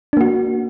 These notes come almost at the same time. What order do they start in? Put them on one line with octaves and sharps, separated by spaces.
D4 A#3 F#4